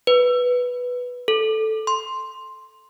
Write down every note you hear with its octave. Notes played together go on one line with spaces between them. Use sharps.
B4
A4
C6